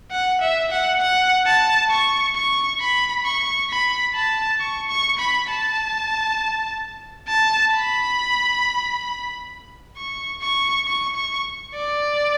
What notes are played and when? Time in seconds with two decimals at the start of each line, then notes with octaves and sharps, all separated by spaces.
0.11 F#5
0.41 E5
0.71 F#5
1.01 F#5
1.46 A5
1.90 C#6
2.36 C#6
2.80 B5
3.24 C#6
3.70 B5
4.15 A5
4.60 C#6
4.89 C#6
5.19 B5
5.48 A5
7.28 A5
7.73 B5
9.97 C#6
10.42 C#6
10.86 C#6
11.16 C#6
11.75 D5